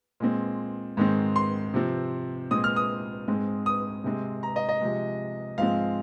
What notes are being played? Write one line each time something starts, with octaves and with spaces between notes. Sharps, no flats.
A#2 G#3 C4
G#2 D#3 G#3 C4
C6
C3 F3 C4
A#2 G#3 C4 D#6
F6
D#6
G#2 G#3 C4
D#6
C3 G#3 C4
A#5
D#5
D#5
C3 F3 G#3
G#2 F3 G#3 C4 F5